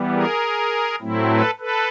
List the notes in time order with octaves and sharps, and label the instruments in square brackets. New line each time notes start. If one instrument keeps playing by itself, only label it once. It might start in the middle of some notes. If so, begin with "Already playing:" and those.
Already playing: [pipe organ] E3 G3 B3
G#4 A#4
A2 F#3 A3 C4 E4
A4 B4
A4 B4